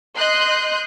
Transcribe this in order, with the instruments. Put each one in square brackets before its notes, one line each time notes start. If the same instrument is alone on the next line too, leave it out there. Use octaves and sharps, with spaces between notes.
[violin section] D#5 C6 F#6 G6